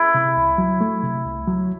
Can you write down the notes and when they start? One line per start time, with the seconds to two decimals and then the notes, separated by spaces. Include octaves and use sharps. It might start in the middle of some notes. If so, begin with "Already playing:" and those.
Already playing: E4
0.14 C3
0.37 C2
0.58 F#3
0.81 A3
1.03 C3
1.25 C2
1.47 F#3